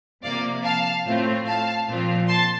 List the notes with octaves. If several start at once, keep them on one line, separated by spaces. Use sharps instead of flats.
C3 F3 A#3 D5 F5
F5 A5
A2 A3 C4 F4
F5 A5
A#2 F3 C4 F4
A5 C6